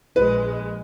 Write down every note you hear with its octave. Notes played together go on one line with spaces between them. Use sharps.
A#1 G#3 B4